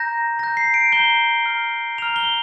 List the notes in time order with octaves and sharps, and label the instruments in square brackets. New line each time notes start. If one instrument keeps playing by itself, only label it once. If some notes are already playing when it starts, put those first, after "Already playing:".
Already playing: [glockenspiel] A#5 G6 A#6
A#5 G6 A#6
C7
D7
A#5 G6 G7
A#5 F6
A#5 F6 F7
G7